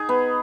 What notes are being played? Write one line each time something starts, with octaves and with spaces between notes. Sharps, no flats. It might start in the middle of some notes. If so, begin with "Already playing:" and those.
Already playing: D#4 G#4
B3